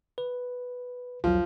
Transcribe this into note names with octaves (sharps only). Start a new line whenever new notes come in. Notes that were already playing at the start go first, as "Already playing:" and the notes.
B4
B1 E2 F3 F#3